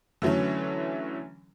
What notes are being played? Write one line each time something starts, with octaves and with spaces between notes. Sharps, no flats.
D3 E3 F#3 A3 C#4